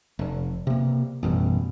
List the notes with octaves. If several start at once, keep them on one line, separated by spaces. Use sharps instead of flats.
F1
C3 A#3
A1 F#2 B2 G3